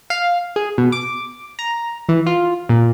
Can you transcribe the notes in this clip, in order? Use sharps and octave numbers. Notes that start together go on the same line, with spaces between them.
F5
G#4
B2
D6
A#5
E3
F4
A#2